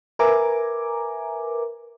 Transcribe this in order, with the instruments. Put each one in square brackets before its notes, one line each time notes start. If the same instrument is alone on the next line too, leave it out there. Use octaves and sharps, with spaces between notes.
[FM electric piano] A#4 B4 E5 G#5 A#5 D6